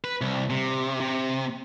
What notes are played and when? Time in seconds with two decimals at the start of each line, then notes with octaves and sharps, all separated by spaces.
0.04 B4
0.21 C2
0.50 C3
1.00 C3